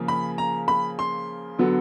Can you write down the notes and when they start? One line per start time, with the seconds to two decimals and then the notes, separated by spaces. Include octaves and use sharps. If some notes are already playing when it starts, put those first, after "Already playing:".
Already playing: C#3 F3 A#3
0.08 B5
0.38 A#5
0.68 B5
0.99 C6
1.59 D3 F#3 B3